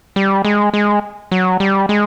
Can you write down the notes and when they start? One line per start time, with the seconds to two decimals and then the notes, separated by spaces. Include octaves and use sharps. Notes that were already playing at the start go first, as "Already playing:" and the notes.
0.16 G3
0.45 G#3
0.74 G#3
1.32 F#3
1.60 G3
1.89 G#3